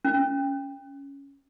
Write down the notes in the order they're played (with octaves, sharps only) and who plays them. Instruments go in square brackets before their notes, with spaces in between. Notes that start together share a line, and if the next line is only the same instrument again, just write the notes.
[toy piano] C#4